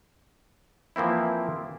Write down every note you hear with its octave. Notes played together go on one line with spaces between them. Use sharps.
E3 F3 A#3 C4 E4